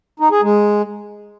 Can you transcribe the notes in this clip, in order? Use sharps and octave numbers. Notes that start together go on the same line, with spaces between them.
D#4
G#4
G#3